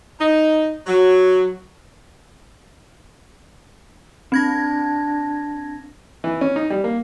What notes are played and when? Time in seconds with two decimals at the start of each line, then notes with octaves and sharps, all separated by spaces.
0.20 D#4
0.87 F#3
4.32 C4 D4 G#6 A#6
6.24 E3
6.41 C#4
6.56 D#4
6.70 G3
6.84 A#3